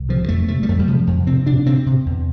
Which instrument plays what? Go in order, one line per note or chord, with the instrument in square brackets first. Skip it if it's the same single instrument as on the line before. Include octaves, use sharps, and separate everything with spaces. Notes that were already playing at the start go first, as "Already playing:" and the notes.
Already playing: [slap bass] C2
C3 F3
F2 A3
C3 A3
G3
F2 A3
G3
C3 F3
F2
C3 C4
C3 D4
C3 C4
C3
E2